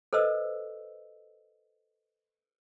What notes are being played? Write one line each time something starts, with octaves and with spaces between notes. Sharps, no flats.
A4 B4 C5 D#5 E6